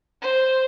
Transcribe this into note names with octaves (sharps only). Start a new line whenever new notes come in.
C5